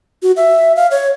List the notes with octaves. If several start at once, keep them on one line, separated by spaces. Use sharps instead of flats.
F#4
E5
F5
C#5